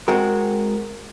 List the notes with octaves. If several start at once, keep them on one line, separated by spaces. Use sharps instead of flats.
G#3 C4 F#4 A#4